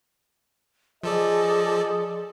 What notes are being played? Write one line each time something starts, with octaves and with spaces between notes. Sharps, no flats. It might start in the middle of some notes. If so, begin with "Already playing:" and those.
F3 G#4 A4 D5 D#5